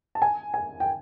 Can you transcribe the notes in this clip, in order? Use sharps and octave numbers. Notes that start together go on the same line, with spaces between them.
A5
G#5
G#5
G5